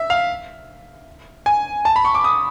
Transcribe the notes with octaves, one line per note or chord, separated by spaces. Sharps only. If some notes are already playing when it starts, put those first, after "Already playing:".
Already playing: E5
F5
G#5
A5
B5
C#6
D6
D#6